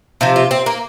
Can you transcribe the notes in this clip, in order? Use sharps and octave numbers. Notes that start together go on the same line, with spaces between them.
C3 F3 F4
F4
C4
A#3